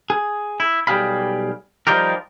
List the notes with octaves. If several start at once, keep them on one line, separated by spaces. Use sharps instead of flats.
G#4
E4
B1 G3 G4 G#4 F5 B5
F3 G3 D#4 F4 G4 A#4